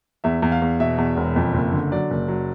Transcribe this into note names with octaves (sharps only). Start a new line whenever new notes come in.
E2 E5
E2
F5
E2
B2 E5
E2
E1
F2
F#1
D3
F#3 D5
F#1
F#3